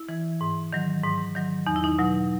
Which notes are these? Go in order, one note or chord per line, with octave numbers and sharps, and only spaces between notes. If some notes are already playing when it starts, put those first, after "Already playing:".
Already playing: E4
E3
G#2
D#3 F#3
G#2
D#3 F#3
E2 D#4
E4
D#3 D#4
B2 F#3